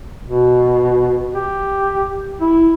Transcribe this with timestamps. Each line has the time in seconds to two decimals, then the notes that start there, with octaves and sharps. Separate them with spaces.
0.24 B2
1.33 G4
2.41 E4